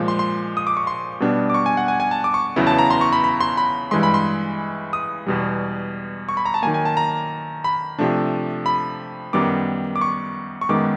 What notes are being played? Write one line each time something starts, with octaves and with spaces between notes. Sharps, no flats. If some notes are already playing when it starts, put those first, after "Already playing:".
Already playing: A#2 F3 G#3
C6
C6
D#6
D6
C#6
C6
B2 G3 B3 D4
D6
C#6
G#5
F#5
G#5
G#5
A5
D6
C#6
E2 C#3 F#3 B3 E4
A5
A#5
C6
C#6
B5
B5
C6
B5
G2 E3 G#3 C6
B5
C6
D#6
E2 B2 G3
C#6
B5
A#5
A5
D#3 F#3 A#3 G#5
G#5
A5
A#5
B5
C3 F3 A3 D4
B5
F#2 D#3 G3 B3 D6
D6
C#6
C#6
F#2 D#3 G#3 B3 D6